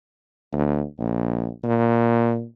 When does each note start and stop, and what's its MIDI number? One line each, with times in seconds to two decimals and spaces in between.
0.53 0.83 38
0.99 1.49 34
1.64 2.44 46